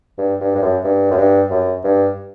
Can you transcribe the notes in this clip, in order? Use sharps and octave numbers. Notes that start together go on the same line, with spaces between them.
G2
G2
G2
F#2
G2
F#2
G2
F#2
G2